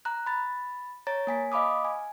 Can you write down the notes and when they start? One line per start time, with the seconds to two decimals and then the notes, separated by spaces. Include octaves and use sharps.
0.05 A#5 F#6
0.26 B5 A6
1.07 C#5 A#5 A6
1.27 A#3 G#5 B6
1.52 D#5 F5 B5 D6 D#6
1.85 G#5